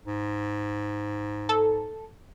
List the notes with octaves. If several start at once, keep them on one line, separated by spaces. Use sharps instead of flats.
G#2
A4